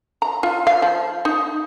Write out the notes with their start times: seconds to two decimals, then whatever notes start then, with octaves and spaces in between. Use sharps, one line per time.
0.22 A#5
0.43 F4
0.67 F5
0.82 F3
1.25 D#4